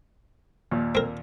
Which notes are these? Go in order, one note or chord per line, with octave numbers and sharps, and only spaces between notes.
D#2 A#2
C4 A#4